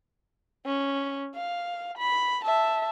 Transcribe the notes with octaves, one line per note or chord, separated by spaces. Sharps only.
C#4
F5
B5
E5 A5